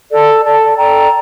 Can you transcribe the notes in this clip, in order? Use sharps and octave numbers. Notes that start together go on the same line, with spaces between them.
A4 D5 A5
A4 D5 A5
A4 D5 G5 A#5